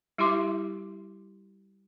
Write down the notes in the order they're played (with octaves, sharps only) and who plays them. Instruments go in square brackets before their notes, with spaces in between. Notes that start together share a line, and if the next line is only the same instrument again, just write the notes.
[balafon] G3 E4 G4 E5 C6 D6